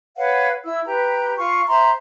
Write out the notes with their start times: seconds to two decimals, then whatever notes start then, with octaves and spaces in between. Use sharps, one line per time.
0.17 B4 C#5 F5 F#5
0.65 E4 E6
0.86 G4 B4 A#5
1.38 F4 C#6
1.68 C5 E5 A#5 C6